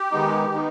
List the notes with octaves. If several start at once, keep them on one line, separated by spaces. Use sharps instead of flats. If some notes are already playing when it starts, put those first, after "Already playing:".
Already playing: G4
D#3 G#3 B3 D#4
D#3 B3 D#4